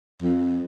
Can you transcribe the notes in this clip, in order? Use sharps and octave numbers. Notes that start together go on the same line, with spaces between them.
F2